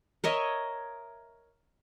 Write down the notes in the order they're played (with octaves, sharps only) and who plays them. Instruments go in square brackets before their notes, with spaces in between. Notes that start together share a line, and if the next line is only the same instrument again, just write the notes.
[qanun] A#4 C#5 D#5 E5